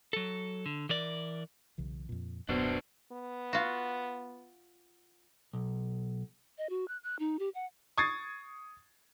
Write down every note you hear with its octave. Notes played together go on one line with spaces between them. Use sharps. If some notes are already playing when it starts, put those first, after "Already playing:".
F#3 A4
D3
E3 A#4 D5
B1 C#3 E3
F2 A#2
D1 F#2 B2 B3 D4 C5
B3
F4 F#4
B1
D#5
F#4
F#6
F#6
D#4
G4
F#5
C#6 D#6 G#6 A6 C7